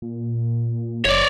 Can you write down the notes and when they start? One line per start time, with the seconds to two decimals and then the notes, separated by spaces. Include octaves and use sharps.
0.02 A#2
1.05 F#1 C#5 D5